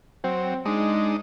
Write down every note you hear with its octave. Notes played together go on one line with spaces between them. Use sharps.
F#3 C4
G#3 D4 D#4